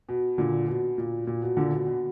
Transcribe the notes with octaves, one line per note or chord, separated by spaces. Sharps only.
B2
A#2 D3
B2
A#2
A#2
B2
A#2 D3
B2
B2